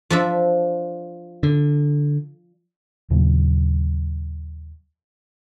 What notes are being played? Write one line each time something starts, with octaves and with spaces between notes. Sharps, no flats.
F3 D4 E5
D3
D#2 A#2 C#3 F#3